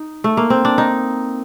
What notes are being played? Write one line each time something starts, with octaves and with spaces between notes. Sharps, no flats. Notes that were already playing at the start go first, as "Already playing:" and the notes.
Already playing: D#4
A3
A#3
C4
D4
D#4